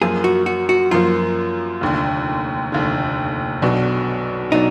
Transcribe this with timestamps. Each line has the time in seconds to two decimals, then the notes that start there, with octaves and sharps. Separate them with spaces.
0.01 F#2 F3 A#3 G#4
0.24 F#4
0.46 F#4
0.69 F#4
0.91 F#2 F3 A#3 F4
1.81 F1 D#2 D3
2.72 F1 D#2 D3
3.62 B1 B2 F#3 D4 F#4
4.52 B2 F#3 D4 D#4